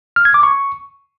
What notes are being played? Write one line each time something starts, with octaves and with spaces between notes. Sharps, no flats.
F6
G#6
D6
C#6